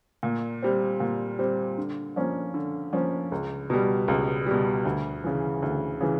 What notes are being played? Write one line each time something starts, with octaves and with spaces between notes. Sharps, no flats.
A#2
G3 C4
A#2
G3 C4
D3
F3 A#3 C#4
D3
F3 A#3 C#4
C#2
B2 G3
C#2
B2 G3
D2
C#3 E3
D2
C#3 E3